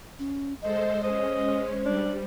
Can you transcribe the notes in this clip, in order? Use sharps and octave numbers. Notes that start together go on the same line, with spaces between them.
C#4
G#3 A4 C5 D#5
G#3 C#4 C5 D#5
G3 D4